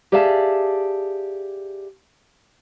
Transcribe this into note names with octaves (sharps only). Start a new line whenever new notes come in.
G4 G#4 D5 E5 F5 A5